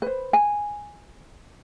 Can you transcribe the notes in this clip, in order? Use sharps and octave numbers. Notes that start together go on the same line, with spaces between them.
B4 C5
G#5